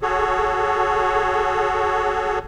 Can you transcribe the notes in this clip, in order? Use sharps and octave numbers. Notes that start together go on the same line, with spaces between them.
F#4 G#4 A4 C#5